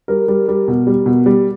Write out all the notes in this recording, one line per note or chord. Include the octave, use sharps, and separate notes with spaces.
G3 A#4
G3
G3
B2
G3
B2
G3